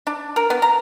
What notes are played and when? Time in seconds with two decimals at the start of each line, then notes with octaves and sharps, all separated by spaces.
0.07 D4
0.36 A#4
0.50 B3
0.62 A#5